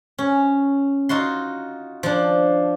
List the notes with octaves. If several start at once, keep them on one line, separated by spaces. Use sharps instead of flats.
C#4
D#4 F4 F#4 C6
F3 D4